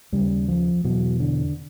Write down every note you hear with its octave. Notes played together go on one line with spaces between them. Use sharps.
D#2 C#3 G3
F3
E2 B2 F#3
D3